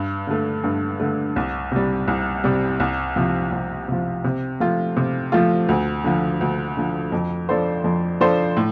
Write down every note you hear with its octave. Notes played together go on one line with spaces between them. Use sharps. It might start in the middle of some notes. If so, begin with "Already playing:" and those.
Already playing: G2
D3 A3
G2
D3 A3
C2
C3 G3
C2
C3 G3
C2
C3 F3
C2
C3 F3
C3
F3 A3 F4
C3
F3 A3 F4
D2
D3 F3
D2
D3 F3
F2
F3 D4 A4 C5
F2
F3 D4 A4 C5
A2